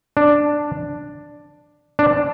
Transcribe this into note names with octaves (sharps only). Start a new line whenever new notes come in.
D4
D4